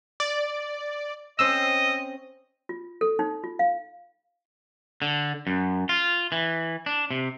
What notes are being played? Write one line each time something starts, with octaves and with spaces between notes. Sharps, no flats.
D5
C4 C#4 C5 D#5 E6
F4
A4
D#4
F4
F5
D3
F#2
F4
E3
D4
C3